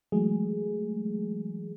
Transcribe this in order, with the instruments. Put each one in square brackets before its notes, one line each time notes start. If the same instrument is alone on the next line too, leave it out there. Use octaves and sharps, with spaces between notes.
[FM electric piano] E3 F#3 G#3 A3 G#4